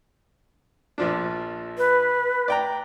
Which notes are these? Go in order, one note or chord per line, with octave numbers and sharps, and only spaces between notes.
A#1 F3 D4
B4
D5 G5 A#5